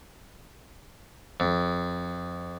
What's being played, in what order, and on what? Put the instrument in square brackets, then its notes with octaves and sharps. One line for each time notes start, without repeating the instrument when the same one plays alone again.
[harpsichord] F2